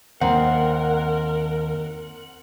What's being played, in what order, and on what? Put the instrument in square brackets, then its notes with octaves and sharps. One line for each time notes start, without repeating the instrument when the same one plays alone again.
[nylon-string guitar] D#2 [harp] C4 [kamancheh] A#4 [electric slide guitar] F#5